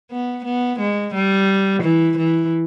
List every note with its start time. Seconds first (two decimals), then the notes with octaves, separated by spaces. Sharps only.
0.11 B3
0.45 B3
0.80 G#3
1.14 G3
1.83 E3
2.18 E3